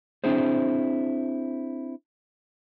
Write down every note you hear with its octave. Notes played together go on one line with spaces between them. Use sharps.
C4 D4 E4 G#4 C5